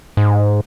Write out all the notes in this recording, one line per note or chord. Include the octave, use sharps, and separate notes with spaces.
G#2